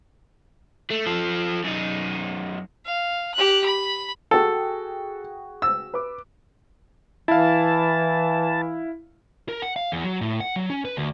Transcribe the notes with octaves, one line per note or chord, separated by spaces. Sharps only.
A3
F3 A4
F#2 D#4
F5
G4 F#6
B5
F#4 G#4 A4 G5
E6
B4 D6
E3 E4 F5 A5
A#4
F#5
F5
E2
F#3
A2
F#5
F#3
C#4
B4
D2